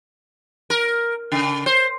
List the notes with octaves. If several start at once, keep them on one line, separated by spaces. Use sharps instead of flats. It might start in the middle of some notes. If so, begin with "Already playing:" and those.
A#4
C#3
C5